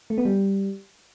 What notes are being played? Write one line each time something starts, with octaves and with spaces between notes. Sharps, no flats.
A3
B3
G3